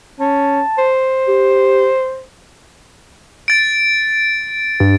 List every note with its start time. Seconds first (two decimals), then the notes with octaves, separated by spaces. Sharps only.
0.20 C#4 A5
0.78 C5
1.28 G4
3.48 A6 D7
4.80 G2